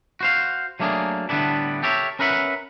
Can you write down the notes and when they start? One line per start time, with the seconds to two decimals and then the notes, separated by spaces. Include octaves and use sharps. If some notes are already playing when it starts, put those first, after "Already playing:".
0.21 F#4 C5 F5
0.80 F#3 A3 A#3 D4 G#4
1.29 A2 D3 G3 B3 D4 E4
1.83 G4 A4 A#4 C#5 E5
2.19 C#4 A#4 B4 E5 F#5